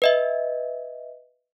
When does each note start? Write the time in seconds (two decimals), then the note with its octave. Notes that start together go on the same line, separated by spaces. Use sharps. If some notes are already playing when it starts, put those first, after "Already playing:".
0.02 B4 D#5 E5